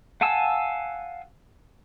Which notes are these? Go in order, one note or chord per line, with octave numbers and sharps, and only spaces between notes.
F5 F#5 G#5 A5 E6